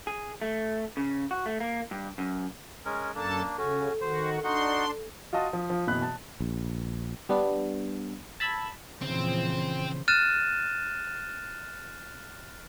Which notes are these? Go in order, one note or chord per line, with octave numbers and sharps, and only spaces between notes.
G#4
A3
C#3
F#4
A3
A#3
G2
F#2
G#3 C#4 A#4
F#2 A#3 D4 A4 A5
C#3 C#4 F#4 A4
D#3 F#4 C5
D4 D#4 F#4 F#5 C6
F4 F#4 D#5 A5 D#6
F3
F3
F#1 B2 E3 B5 F#6
A5
A#1
G3 B3 D4
A5 B5 E6 G#6
F2 A#2 C#3 E3 F3 C4 C5
F6 F#6 A6 D#7 E7